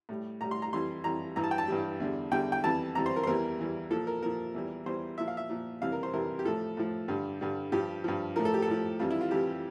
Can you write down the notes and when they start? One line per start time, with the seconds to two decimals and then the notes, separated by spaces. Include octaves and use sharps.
0.09 A2 G3
0.41 A2 G3 A#5
0.51 C6
0.62 A#5
0.73 F2 E3 G3 C6
1.04 F2 E3 G3 A#5
1.36 G2 E3 G3 A#5
1.44 A5
1.51 G5
1.58 A5
1.68 G2 E3 G3
2.00 E2 D3 G3
2.31 E2 D3 G3 G5
2.52 G5
2.64 F2 E3 G3 A5
2.95 F2 E3 G3 A#5
3.06 C5
3.16 A#4
3.23 C5
3.27 E2 E3 G3 A#4
3.59 E2 E3 G3
3.91 A#2 F3 A4
4.07 A#4
4.23 A#2 F3 A#4
4.54 E2 E3 G3
4.86 E2 E3 G3 C5
5.18 A#2 F3 E5
5.28 F5
5.37 E5
5.49 A#2 F3
5.82 F2 C3 E3 G3 F5
5.92 A#4
6.03 C5
6.13 F2 C3 E3 G3 A#4
6.39 G4
6.45 A2 F3 A4
6.77 A2 F3
7.08 G2 D3 G3
7.41 G2 D3 G3
7.72 G2 F3 G4
8.04 G2 F3
8.36 A2 F3 A#4
8.45 A4
8.54 G4
8.62 A4
8.68 A2 F3
8.99 F2 E3 G3 F4
9.11 E4
9.21 F4
9.31 F2 E3 G3 G4